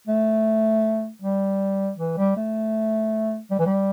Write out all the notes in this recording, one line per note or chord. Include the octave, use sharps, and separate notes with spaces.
A3
G3
E3
G3
A3
G3
E3
G3